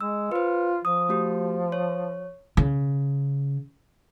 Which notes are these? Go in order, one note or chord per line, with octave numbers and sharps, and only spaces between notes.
G#3 E6
F4 B4 C5
F3 D#6
A3 F#4 G4
C#5
C#3